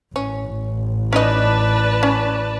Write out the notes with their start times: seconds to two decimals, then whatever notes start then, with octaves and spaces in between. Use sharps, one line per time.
0.16 A1 C#4
1.13 C#4 D#4 B4 D5 D#5 A5
2.03 C#4